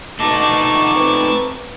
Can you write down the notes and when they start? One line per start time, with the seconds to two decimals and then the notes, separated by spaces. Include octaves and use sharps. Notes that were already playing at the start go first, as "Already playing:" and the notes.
0.19 D2 B2 A3 D#4 A5 C#6 D6
0.95 C4 B4